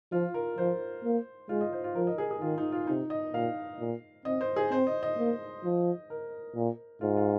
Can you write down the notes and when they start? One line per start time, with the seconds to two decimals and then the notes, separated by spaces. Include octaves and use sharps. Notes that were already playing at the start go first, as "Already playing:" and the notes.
0.12 F3 F4
0.34 A#4
0.57 F3 C5
1.04 A#3
1.49 G#3 F4
1.61 D#5
1.73 C5
1.84 F4
1.95 F3 A#4
2.07 D#5
2.18 G#4
2.31 G#4
2.41 D#3 F4
2.58 D#4
2.72 F4
2.87 C3 D#4
3.10 D#5
3.34 A#2 F5
3.80 A#2
4.25 C4 D#5
4.41 C5
4.56 G#4
4.71 C4 C5
4.87 D#5
5.03 D#5
5.18 A#3
5.64 F3
6.10 A#4
6.55 A#2
7.01 G#2 F4
7.17 F4